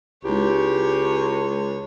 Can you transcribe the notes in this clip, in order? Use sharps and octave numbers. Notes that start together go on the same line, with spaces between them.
C#2 G#3 D#4 E4 G4 C#5